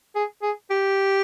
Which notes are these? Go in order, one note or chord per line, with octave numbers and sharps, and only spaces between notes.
G#4
G#4
G4